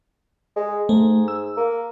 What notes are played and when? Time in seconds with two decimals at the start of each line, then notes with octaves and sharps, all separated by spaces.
0.56 G#3
0.89 G#2 A3
1.28 E6
1.57 A#3